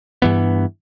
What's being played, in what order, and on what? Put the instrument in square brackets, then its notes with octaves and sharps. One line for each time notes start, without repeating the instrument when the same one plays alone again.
[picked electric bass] G2 E3 B3